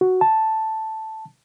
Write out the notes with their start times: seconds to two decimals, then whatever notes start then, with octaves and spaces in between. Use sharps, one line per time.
0.01 F#4
0.21 A5